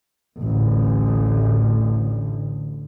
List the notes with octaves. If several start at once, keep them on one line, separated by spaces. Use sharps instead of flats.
A1 D2